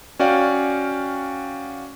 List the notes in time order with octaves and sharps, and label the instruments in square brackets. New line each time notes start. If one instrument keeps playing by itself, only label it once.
[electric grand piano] C#4 F#4 D5 F5 G5